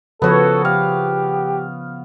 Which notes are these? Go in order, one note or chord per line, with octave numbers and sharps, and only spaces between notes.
C#3 F3 B3 F#4 A4 C#5
G4 F5